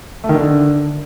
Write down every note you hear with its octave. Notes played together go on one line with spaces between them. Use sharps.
A3
D#3
D3